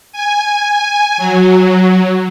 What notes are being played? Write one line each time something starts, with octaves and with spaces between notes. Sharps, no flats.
G#5
F#3